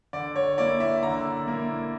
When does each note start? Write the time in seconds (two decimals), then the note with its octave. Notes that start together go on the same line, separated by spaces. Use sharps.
0.13 D3 D5
0.36 C#5
0.58 A#3 E4 D5
0.80 E5
1.03 D3 A#5
1.47 A#3 E4